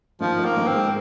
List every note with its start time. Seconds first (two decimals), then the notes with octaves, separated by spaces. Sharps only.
0.21 D#3 F3
0.39 D#3
0.45 A#3
0.57 D#3
0.68 C4
0.74 G#2